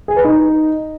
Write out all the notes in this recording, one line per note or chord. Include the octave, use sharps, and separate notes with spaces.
G#4
B4
D#4